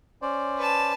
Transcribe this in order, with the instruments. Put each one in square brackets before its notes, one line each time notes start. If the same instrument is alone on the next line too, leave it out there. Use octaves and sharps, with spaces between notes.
[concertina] C#4 C5 D5
[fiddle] B4 A5